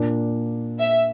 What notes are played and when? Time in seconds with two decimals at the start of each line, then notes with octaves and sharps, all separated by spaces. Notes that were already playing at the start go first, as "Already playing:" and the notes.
Already playing: A#2 A#3 D4
0.80 E5